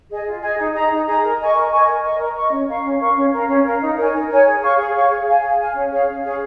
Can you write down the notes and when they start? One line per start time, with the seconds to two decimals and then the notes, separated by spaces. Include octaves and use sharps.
0.09 G#4 D#5 G#5
0.26 F4
0.42 G#4 D#5 G#5
0.58 D#4
0.74 G#4 D#5 A#5
0.91 D#4
1.07 G#4 D#5 A#5
1.23 A#4
1.39 D#5 G#5 C#6
1.55 A#4
1.71 D#5 G#5 C#6
1.87 A#4
2.03 D#5 C#6
2.19 A#4
2.36 D#5 C#6
2.52 C#4
2.68 A#4 F5 C#6
2.85 C#4
3.00 A#4 F5 C#6
3.16 C#4
3.32 A#4 F5
3.49 C#4
3.64 A#4 F5
3.81 D#4
3.97 A#4 C#5 G#5
4.13 D#4
4.29 A#4 C#5 G#5
4.46 G#4
4.62 C#5 F5 C#6
4.78 G#4
4.94 C#5 F5 C#6
5.09 G#4
5.26 F5 G#5
5.42 G#4
5.58 F5 G#5
5.75 C#4
5.91 G#4 C#5 F5
6.07 C#4
6.23 G#4 C#5 F5